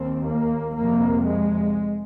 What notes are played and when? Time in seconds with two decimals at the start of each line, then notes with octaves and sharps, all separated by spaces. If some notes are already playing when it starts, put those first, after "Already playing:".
Already playing: D#2 C4
0.28 A#3
0.77 F2 C3 A#3
1.27 G#3